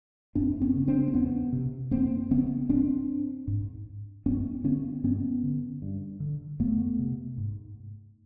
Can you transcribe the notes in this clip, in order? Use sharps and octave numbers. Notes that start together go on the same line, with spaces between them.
F#2 C4 D4
B3 C#4
C#3
C4 D4
C4
E2 B3 C#4
C3
F#2 A#3 C4
C#3 B3 C#4
G#2 C4 D4
G#2
G2 B3 C#4
D3 B3 C#4
G2 B3 C#4
D3
G2
D3
F2 A3 B3
C3
G#2